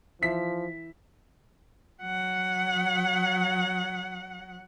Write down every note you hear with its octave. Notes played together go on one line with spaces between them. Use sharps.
E3 F3 E5 B6
F#3 F#5